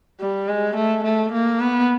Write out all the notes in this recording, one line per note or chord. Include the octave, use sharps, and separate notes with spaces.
G3
G#3
A3
A3
A#3
B3